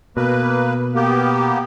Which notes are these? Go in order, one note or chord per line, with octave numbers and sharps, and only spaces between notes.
B2 A#3 B4
A#3 B3 G4